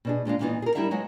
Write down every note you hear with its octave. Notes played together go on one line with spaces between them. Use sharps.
B2 D4 G#4
A#2 G#3 D4 F5
E2 A#2 E3 G3 B3 D#4
G#4 A#4
G3 D#4 E4 G4 E5 F#5
F#3 G#3 B3 F#5